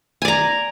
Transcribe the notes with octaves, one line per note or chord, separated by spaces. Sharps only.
D5 G#5 A#5